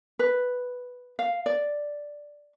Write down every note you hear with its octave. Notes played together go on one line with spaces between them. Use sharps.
B4
F5
D5